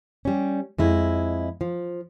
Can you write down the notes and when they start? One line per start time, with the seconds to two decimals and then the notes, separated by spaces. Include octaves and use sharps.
0.25 G3 C#4
0.78 F2 G#3 E4
1.61 F3